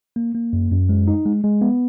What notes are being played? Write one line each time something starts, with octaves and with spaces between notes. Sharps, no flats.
A#3
A#3
F#2
F#2
G#3
D#4
G#3
G#3
B3